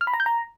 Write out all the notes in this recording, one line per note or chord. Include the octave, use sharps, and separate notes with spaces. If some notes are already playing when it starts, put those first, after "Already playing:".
F6
B5
A#5
G6
A#5